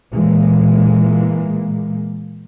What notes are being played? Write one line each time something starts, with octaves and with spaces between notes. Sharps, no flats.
A#2 E3 G#3 A#3